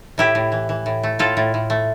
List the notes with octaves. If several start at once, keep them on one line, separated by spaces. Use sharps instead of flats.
A2 E4 G4
A2
E3
E3
A2
A3
A2 F4 A4
A2
A2
A3